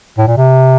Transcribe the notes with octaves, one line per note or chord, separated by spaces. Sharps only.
A2
A#2
C3